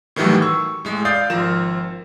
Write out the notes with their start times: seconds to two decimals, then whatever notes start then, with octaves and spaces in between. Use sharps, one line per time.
0.16 A2 D#3 E3 F#3 G3 A3
0.42 C#6 E6
0.85 A2 G#3
1.05 D5 F5 D#6 G6 A6 C7
1.30 G#1 F3 A#4 E7